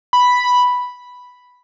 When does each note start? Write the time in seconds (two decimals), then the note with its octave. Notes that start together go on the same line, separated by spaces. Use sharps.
0.13 B5